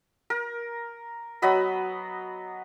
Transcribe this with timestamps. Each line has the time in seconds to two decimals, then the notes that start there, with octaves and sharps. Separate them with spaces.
0.30 A#4
1.42 F#3 B3 D#5 B5